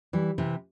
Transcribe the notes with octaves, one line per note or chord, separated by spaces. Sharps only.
E3 G3
C3 E3